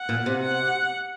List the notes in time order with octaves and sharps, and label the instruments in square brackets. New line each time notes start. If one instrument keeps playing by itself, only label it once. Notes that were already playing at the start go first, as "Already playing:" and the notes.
Already playing: [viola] F#5
[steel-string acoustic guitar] A#2
C3
[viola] F#5